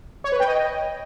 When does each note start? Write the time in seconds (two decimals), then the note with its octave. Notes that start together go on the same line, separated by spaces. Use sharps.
0.24 C#5
0.32 B4
0.40 G5
0.48 D#5